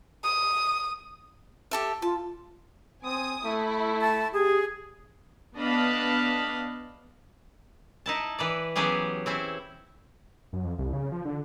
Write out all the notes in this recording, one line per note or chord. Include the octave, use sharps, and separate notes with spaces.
D#6
G4 A4 E5
F4 A5
C4 G#5 D#6
A3 E4
A5
G4 G#4
B3 D4 D#5 F5 A5 B5
D#4 E4 A5
E3 B4 D5
E3 F#3 B3 C#4 G4 G#4
C4 C#4 E4
F#2
F2
C2
C#3
F3
D3